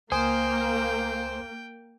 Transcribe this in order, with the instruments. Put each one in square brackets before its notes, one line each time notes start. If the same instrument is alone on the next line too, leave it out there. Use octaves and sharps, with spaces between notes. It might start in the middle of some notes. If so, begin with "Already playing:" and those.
[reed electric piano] C#2 G#5 D#6 [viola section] A#3 [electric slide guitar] C5 [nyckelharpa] G5